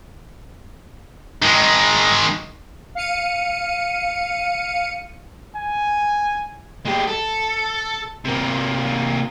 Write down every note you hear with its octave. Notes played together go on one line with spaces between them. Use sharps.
D#3 G#3
F5 C#7 D#7
G#5
G#3 G4
A4
C3 A#3